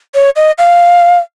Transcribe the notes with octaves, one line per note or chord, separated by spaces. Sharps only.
C#5
D#5
F5